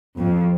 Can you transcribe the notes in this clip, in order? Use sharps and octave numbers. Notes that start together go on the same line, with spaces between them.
F2